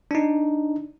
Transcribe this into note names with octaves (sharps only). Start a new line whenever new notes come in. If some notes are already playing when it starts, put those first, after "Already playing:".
D4 D#4